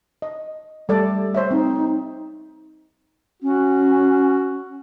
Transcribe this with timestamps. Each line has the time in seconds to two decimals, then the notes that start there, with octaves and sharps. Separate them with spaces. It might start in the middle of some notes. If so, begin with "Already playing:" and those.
0.22 D#5
0.89 G3 A3 A4 D5
1.35 C5 C#5 E5
1.51 C4 D#4
3.42 C#4 F#4